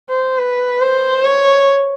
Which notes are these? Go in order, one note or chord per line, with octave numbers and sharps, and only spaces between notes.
C5
B4
C5
C#5